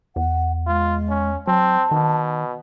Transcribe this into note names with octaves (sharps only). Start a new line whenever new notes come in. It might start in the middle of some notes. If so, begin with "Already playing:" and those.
E2 F#5
G#3 F4
C#4
F#3 C4 A5
B2 D#3